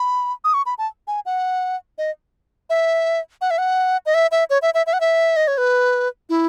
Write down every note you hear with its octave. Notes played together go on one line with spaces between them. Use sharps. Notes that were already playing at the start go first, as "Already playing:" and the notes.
Already playing: B5
D#6
C#6
B5
A5
G#5
F#5
D#5
E5
F#5
E5
F#5
D#5
E5
E5
C#5
E5
E5
E5
F#5
E5
D#5
C#5
B4
E4